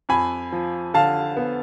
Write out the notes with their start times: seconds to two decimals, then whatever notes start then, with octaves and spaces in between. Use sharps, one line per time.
0.09 F2 G#5 B5
0.52 F3
0.94 D3 F5 A5
1.37 B3